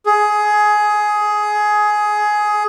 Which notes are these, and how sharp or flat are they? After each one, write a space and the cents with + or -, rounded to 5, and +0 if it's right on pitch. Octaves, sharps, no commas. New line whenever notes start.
G#4 +15